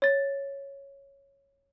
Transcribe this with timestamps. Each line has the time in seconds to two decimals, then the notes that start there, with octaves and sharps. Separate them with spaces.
0.02 C#5 A6